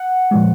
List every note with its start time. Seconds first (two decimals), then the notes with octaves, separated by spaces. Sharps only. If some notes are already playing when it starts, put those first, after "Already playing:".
Already playing: F#5
0.31 A#2 F3 G#3